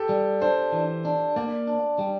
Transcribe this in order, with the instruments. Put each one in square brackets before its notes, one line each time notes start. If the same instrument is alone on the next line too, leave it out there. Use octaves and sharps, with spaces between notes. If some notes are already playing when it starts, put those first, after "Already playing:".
Already playing: [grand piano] G4 A4
[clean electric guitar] G3
[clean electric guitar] D4 [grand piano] C5
[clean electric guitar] E3
D4
[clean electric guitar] A#3 [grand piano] D5
[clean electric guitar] D4
G3